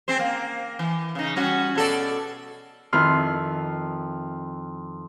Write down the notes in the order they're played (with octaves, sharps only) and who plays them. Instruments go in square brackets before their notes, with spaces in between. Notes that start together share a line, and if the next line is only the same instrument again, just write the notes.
[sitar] C4 G#4 C5
A#3
E3
C#3 D#4
G3 C#4 F#4
B2 A4 D5
[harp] F2 D#3 E4 C6 F6